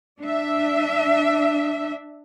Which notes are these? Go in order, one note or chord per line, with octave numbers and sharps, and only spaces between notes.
D4 E5